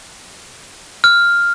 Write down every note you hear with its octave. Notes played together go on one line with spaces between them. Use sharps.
F6